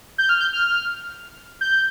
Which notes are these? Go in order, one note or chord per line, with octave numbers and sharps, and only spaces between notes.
G6
F6
G6
F6
G6